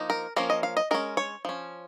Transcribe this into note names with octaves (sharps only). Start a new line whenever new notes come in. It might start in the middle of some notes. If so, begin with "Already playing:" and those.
Already playing: F3 A#3 D#4
A#4
F3 A#3 C#4 A#4
D#5
F5
D#5
G#3 C#4 A#4
C#5
F3 C#4